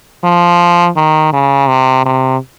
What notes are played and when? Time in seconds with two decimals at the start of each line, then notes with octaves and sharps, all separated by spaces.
0.24 F3
0.96 D#3
1.33 C#3
1.68 C3
2.06 C3